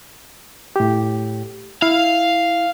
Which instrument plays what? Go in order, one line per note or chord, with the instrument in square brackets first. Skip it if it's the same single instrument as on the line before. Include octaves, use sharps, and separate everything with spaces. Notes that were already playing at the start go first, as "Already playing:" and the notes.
[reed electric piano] A2 G4
[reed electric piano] E4 [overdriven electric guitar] F5